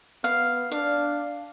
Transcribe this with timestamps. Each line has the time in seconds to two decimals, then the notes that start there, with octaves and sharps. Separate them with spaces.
0.24 B3 F5
0.72 D4 F5